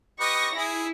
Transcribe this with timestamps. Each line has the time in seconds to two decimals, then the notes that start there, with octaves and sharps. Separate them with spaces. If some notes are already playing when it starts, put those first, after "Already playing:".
0.20 G4 B4 D#5 C#6 A#6
0.57 E4 G#4